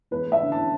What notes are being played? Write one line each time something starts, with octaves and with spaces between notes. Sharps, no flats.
E1 B4
A3
E5
D3
A5